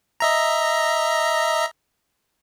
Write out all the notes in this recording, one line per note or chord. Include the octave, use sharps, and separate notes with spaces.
D#5 E5 A#5